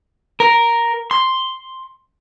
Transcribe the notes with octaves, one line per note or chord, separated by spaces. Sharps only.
A#4
C6